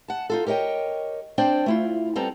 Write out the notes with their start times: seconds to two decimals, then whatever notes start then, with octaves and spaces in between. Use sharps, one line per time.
0.08 F#5 A5
0.30 D#4 F4 A4
0.46 G4 A#4 C#5 D#5 G5
1.38 C4 D4 C5 D5 G5
1.66 A3 E4 F4
2.16 G3 B3 C4 A4 A#5